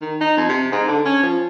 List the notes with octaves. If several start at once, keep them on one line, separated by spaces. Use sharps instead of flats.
D#3
D#4
F2
C3
G#2
D3
C#4
F3